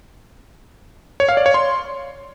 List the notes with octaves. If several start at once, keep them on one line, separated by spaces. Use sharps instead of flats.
C#5
F5
D5
C#5
C6